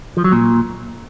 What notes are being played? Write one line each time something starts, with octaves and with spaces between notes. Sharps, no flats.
F3
F#3
A#2